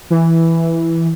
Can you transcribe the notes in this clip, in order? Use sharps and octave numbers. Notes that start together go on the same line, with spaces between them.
E3